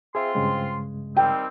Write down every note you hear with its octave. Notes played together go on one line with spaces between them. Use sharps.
C4 F4 G#4 E5 C6
G2 C#3 G#3
D#3 G3 C4 G5